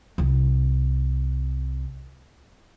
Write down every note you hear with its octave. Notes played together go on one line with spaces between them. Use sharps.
C2 C4